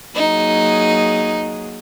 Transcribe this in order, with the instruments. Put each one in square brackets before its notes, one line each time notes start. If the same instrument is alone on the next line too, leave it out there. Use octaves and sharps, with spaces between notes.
[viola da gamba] F#3 A#3 G#4 [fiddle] D#4